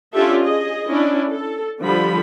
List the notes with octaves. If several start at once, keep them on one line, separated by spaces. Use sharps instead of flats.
C#4 D4 F4 G4 A4 E5
G#4 D#5
C#4 D4 E4
A4
D3 F3 G3 B5